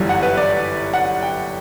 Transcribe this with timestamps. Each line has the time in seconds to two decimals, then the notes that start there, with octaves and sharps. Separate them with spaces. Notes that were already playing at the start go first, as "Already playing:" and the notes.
Already playing: G1 F#2 E3 G3
0.09 F#5
0.23 B4
0.37 D5
0.93 F#5
1.22 G5